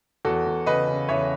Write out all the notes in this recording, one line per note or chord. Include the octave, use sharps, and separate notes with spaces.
E2 F#4 A4
E2
C#3 B4 D#5
C#3
E2 C#5 E5